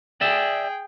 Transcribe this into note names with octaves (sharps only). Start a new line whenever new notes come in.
G#4 D5 E5 G5